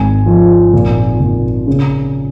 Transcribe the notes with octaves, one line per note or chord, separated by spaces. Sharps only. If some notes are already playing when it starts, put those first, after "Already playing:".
Already playing: G#1 G#5
F3
A#2
A#2
C#3